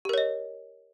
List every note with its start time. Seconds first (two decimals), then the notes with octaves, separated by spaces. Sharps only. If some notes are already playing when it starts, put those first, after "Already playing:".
0.05 G4
0.09 A#4
0.13 C#5
0.18 D#5